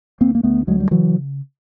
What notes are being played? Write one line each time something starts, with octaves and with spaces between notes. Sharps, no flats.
D2 A#3 C4
A#3
D2 A3 B3
D2 F#3 G#3
G3
C#3 E3 F#3